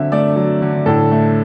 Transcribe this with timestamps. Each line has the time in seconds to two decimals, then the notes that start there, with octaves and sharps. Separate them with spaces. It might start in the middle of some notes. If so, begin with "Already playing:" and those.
Already playing: D3 F#3 C4 E5
0.12 A3 D5
0.36 F#3
0.62 D3
0.86 A2 A4
1.12 A3